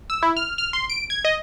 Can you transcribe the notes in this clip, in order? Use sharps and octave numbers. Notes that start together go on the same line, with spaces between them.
E6
E4
F6
F6
C6
D7
G#6
D#5